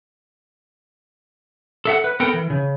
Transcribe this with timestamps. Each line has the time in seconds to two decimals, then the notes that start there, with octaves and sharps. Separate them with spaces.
1.85 A4 E5 F#5
2.04 B4
2.20 B3 A4 A#4 F#5 G5
2.34 E3
2.50 C#3